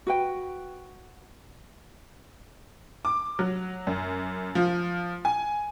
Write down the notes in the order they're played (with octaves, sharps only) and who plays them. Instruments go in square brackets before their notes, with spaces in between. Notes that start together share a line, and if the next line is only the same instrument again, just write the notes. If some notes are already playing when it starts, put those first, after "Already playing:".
[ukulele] F#4 B4 G5
[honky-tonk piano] D6
F#3
F#2
F3
G#5